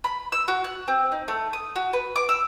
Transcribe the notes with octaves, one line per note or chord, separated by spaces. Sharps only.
B5
E6
F#4
F#6
C4
D#4
A3
D#6
F#4
B4
D6
E6